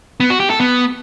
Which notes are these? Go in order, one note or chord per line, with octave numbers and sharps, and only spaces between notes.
B3
F#4
G4
A4
B3